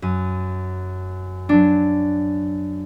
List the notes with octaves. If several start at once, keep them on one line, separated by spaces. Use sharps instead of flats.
F#2 D#7
F#3 D4